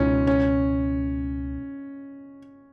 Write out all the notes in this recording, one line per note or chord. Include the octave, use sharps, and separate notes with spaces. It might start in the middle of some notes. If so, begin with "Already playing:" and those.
Already playing: C#2 B2 G#3 C#4 D#4 F4
C#4